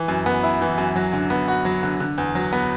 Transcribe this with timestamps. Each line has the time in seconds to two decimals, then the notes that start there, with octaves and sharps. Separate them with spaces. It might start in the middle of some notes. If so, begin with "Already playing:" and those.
Already playing: E3
0.08 F#2
0.26 B3
0.43 E4
0.61 E3
0.78 F#2
0.96 F#3
1.13 D3
1.30 B3
1.48 F#4
1.65 F#3
1.83 D3
2.00 D3
2.18 E2
2.35 F#3
2.53 B3